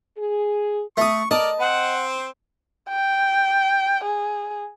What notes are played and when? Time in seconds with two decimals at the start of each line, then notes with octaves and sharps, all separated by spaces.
0.17 G#4
0.97 A3 C#6 D#6
1.31 A#4 D5 D#5 A5
1.60 C4 C5 F#5
2.89 G5
4.04 G#4